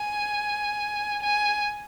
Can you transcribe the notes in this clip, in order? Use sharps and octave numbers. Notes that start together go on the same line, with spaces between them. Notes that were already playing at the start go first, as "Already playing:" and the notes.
Already playing: G#5
G#5